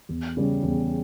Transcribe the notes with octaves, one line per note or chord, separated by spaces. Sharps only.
E2
C#3 G3 C#4
E2